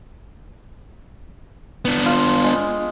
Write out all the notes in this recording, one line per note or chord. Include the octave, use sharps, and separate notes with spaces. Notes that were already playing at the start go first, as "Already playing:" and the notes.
B3 D4
F4
G#3